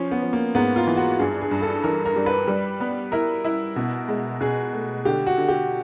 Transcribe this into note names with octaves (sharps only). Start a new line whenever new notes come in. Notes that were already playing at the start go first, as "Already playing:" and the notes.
Already playing: F3 C#4
B3
F3
A#3
G#2 B3
F4
E3
F#4
G2 G#4
G#4
G2
A4
E3 A#4
A#4
G3
B4
G3
B3
E4 A#4
E4
B2
G#3
B2 G#4
A3
D3 G4
F#4
D3
G4